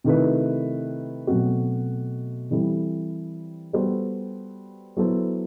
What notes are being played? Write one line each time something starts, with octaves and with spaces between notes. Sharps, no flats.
C3 D#3 A3 E4 B4
B2 F#3 A3 C4 F#4
E3 G3 C4 E4 A4
G3 B3 F#4 A4 C5
F#3 B3 E4 A4 C5